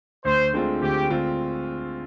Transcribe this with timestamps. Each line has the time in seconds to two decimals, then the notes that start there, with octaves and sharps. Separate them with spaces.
0.25 D2 C5
0.53 D3 G#3 C4 F4
0.81 D2 G4
1.10 D3 G#3 C4 F4